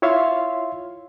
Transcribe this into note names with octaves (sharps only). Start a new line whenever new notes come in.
E4 F4 C#5 E5 F5 C6